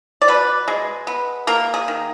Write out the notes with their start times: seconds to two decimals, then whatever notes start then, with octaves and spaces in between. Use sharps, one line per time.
0.22 D5
0.28 B2 B4
0.68 G#3
1.07 B3
1.47 A#3 A#4
1.74 G#4
1.88 D#3